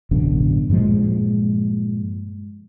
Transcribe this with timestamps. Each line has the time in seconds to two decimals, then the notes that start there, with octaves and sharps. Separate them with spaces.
0.11 A1 F#2 B2 D3
0.69 G2 A#2 F3 G#3